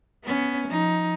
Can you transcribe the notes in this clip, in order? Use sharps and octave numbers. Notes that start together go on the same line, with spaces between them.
B3 C#4
F3 D#4